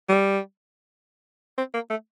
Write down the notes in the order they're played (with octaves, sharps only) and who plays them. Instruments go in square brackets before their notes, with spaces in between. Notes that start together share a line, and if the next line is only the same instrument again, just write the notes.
[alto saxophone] G3
C4
A#3
A3